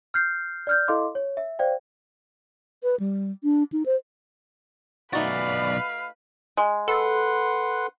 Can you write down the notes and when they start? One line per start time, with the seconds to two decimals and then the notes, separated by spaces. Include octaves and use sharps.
0.14 F6 G6 C7
0.67 D5 F6 G6
0.88 E4 A4 D#5 F5 C6 D6
1.15 C#5
1.37 E5
1.59 C5 D5 F5 G5
2.83 B4
3.00 G3
3.44 D4
3.73 D#4
3.86 C5
5.13 B1 A3 D#4 F#4 B4 D5 F5
6.57 G#3
6.88 A4 B4 F#5 C6